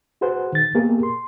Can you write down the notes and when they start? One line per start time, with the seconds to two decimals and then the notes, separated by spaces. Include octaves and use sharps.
0.21 F#4 G#4 B4 C5 F#5
0.52 D#3 A6
0.75 A#3 B3 G4 G#4 A#4
1.03 C6